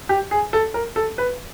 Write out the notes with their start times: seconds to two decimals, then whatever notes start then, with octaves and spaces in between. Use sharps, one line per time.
0.09 G4
0.31 G#4
0.53 A4
0.74 A#4
0.96 A4
1.18 B4